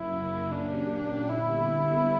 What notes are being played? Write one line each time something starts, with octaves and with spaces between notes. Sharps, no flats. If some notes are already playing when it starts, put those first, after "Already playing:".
Already playing: F#2 C#3 F#3 A#3 C#4 E4
A#2 A#3 C#4 D4 G4
D3 G3 B3 E4